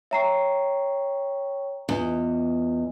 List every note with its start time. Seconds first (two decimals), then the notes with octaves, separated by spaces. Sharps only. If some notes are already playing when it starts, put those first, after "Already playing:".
0.11 C#5 E5 G5 A#5 C#6 C7
1.89 E2 F4 D#5